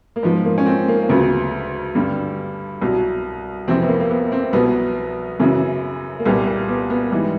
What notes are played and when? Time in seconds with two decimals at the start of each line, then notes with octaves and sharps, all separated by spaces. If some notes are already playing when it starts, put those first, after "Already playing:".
0.16 A#3
0.23 G#2 F3 B3
0.45 A#3
0.58 C#4
0.66 C4
0.88 A#3
1.03 A#3
1.09 D2 C#3 F#3 B3
1.95 G2 D3 G3
2.81 C2 B2 F#3
3.68 F2 C3 E3 C4
3.82 B3
3.88 A#3
4.00 A#3
4.10 B3
4.32 C4
4.53 C2 B2 F#3 B3
5.40 F#2 C#3 E3
6.19 A#3
6.25 C2 A#2 G3 B3
6.46 A#3
6.68 B3
6.90 B3
7.11 G#2 E3 G3